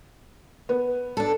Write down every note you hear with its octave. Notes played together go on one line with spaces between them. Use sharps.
B3
D4 A4